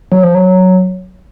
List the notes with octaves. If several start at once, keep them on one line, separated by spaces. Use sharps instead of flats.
F#3
F3
F#3